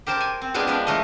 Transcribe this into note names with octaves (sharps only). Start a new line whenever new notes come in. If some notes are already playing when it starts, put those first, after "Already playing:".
G4 A#4 C5 G5 A5
G#5 C6
C4
G#3 B3 D4 F4 G4 G#4
F3 G#3 D4 A#4 B4
E3 G#3 A3 A#4 D#5